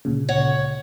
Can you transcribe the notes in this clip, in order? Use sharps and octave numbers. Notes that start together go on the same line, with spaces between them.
D2 A#2 C#3
C#5 F#5